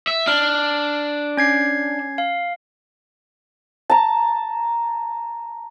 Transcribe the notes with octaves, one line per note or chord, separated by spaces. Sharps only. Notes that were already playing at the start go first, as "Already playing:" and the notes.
E5
D4 F6
C#4 G#6 C7
F5
A5 A#5